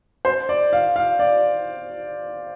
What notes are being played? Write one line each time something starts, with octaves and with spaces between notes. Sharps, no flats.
C5
D5
F5
F5
D5